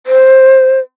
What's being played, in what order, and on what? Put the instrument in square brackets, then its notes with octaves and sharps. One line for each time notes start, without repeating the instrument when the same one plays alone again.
[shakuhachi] C5